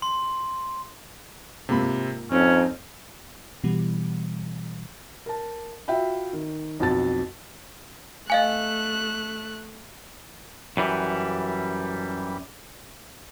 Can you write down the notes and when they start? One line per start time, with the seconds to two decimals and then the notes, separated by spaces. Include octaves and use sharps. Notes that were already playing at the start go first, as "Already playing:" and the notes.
0.02 C6
1.69 G#2 C3 A#3 C4 F4 B5
2.32 F2 C4 C#4 D#4
3.64 B2 E3 G3
5.26 A#4 A5
5.88 F4 F#4 E5 G5 B5
6.33 D#3
6.80 B1 F2 F#4 A5 A6
8.30 A3 D#5 F5 G#5 F#6
10.77 F#2 E3 G3